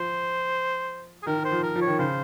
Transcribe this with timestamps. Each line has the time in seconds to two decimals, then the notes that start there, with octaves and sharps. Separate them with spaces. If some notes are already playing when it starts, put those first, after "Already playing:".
Already playing: F3 C5
1.23 G#4
1.26 D#3 A#4
1.44 C5
1.51 F3
1.63 A#4
1.75 F3
1.82 C#5
1.87 D#3
1.99 C#3 C5